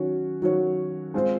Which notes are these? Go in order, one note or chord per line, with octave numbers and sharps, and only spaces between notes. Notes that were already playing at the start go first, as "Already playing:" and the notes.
Already playing: D#3 F#3 C#4 F#4 C#5
D#3 F#3 C#4 F#4 C#5
G#3 C4 F4 C5